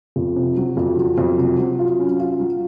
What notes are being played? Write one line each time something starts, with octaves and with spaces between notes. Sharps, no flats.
F2
C3
F#3
F2
F#3
F2
C3
F#3
F4
C#4
F4
F#3